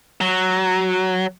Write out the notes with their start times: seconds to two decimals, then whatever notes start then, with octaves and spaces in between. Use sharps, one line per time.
0.21 F#3